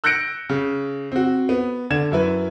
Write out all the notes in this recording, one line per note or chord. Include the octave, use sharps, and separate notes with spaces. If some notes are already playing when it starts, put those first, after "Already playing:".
E6 F#6 G6 A#6 C#7 D7
C#3
C4 F#4
B3
D3 G#6 E7
F#2 E4 B4